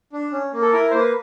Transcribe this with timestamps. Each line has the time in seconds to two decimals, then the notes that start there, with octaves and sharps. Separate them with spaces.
0.13 D4
0.32 C#4
0.53 A#3
0.61 A4
0.72 E4 A#4
0.91 A#3 C5
0.99 B4